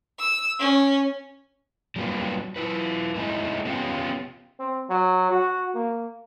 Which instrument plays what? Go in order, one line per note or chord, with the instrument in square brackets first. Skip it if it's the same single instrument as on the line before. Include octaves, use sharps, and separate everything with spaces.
[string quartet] E6
C#4
[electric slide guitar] F#3 G3 A#3 D4 F4 B4
E4 F4 B4
G#3 A3 D#4 E4
B3 C#4 F4 G4
[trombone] C4
F#3
F#4
A#3